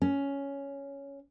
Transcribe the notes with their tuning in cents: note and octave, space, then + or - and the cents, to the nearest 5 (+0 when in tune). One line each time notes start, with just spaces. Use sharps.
C#4 +5